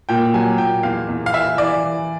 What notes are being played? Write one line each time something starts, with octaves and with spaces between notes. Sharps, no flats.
A#2 G5
F#3 G#5
A#2 G5
E2 F5
E2
F5
E3 E5
E3 D5
E3